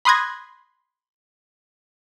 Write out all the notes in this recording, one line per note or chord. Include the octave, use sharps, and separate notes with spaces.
B5 C6 D#6 F#6 G#6 A#6